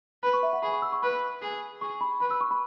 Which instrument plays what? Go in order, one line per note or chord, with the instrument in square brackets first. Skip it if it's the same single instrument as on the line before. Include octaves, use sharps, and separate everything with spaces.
[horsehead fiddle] B4 [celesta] B5
[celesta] C#6
E5
F#5
[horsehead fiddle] G#4 [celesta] B5
[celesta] C#6
E6
C#6
[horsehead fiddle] B4 [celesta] B5
[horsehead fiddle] G#4
[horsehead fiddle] G#4 [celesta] C#6
[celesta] B5
[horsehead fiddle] B4 [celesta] B5
[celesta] E6
C#6
B5